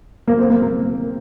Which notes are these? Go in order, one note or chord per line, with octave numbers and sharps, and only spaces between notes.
A#3
C4
A#3
A#3